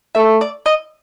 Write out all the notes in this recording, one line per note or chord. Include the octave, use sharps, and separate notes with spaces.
A3 E5
D5
D#5